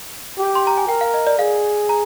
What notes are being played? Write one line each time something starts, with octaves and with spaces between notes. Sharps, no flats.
G4
C6
A#5
G#5
A#4 G5
F5
D#5
D5
G#4 F5
A#5